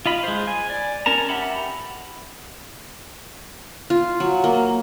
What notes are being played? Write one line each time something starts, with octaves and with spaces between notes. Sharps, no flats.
F4 D#5 B5
G#3 C5
G#5
D5
C#4 A#4 A5 A#5
G4 E5 F#5 B5
F4
F#3
A#3